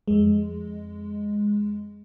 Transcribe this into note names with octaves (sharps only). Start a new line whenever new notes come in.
F2 G#3